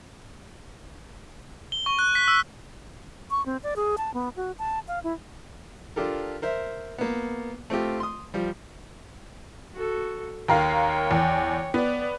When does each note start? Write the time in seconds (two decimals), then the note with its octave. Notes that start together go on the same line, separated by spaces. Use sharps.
1.72 G7
1.86 C#6
1.99 F#6
2.15 B6
2.28 E6
3.31 C#6
3.46 C4
3.63 D5
3.76 G#4
3.98 A5
4.14 B3
4.37 F#4
4.59 A5
4.88 F5
5.04 E4
5.96 D4 F4 G4 A4 A#4
6.42 A#4 C5 E5
6.98 A#3 B3
7.70 A3 C4 F4 G4
8.00 C6 D#6
8.34 F3 G3
9.74 F#4 A4
10.48 D#2 A#4 C#5 F5 G5
11.11 E2
11.74 B3 D5